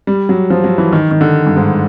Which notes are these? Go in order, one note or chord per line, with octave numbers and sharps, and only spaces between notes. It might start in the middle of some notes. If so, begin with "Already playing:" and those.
G3
F#3
F3
F#3
E3
D#3
D#3
D3
G2
G#2